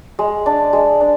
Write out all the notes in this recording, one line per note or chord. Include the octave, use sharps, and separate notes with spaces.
G#3
D4
G#3
D4